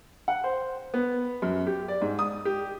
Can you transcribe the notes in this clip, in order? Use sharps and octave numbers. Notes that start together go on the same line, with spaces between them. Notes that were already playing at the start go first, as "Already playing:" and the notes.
F#5
C5
B3
F#2
G4
D5
G#2
D#6
G4